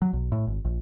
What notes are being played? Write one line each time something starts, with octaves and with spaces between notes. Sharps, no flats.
F#3
B1
A2
G#1
A#1